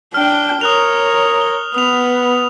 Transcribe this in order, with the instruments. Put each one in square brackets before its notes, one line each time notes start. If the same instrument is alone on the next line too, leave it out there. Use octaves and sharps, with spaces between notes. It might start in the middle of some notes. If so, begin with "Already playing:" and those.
[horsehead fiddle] D4 G5 [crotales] F6
[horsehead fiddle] A#4 C#5 [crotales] D#6 F#6 F7
[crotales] G7
[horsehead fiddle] B3 [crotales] D#6 F7